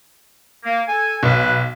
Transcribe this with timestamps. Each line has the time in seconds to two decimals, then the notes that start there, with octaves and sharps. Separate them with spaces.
0.64 A#3
0.88 A4 G#5
1.23 B1 B4